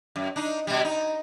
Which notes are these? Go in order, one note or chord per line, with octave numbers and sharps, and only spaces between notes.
F#2
D4 D#4
B2 G3
D#4